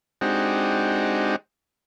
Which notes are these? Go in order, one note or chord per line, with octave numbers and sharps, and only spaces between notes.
G#3 C4 D4 D#4 F#4 G4